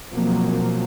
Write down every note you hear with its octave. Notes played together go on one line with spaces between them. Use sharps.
B2 F3 F#3 A#3 C4